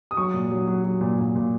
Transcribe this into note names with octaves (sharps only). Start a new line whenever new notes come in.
D#6
F#3 C#6
A#2
F#3
F#3
F#3
A#2
A#2
A#2